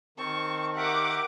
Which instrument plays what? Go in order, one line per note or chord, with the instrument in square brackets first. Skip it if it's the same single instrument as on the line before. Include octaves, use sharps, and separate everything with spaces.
[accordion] D#3 [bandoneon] C4 A5 [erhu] C#6
[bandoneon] G4 A#4 E5 [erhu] F#5 [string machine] D6